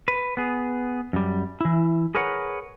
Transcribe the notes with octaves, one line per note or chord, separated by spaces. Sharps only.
B4
B3 G#4
F#2 G3
E3 E4
G#4 A#4 B4 C#5 F#5